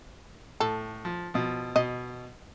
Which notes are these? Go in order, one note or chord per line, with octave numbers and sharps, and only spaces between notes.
A2 A4
F3
B2 F3
B2 D#5